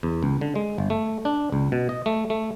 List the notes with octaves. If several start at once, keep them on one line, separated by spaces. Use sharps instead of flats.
E2
C#2
D3
G#3
G1
A3
D4
C#2
B2
D#5
A3
A3